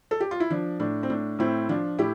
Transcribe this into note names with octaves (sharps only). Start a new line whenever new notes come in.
A4
G4
F4
E4
F3 D4
A2 D4
C4
A2 D4
A2 C4 E4
F3 D4 F4
A2 E4 G4